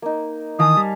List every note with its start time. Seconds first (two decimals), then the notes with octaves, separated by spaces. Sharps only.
0.02 A#3 D#4
0.59 D#3 E3 F5 G#5 A5 D#6
0.77 G3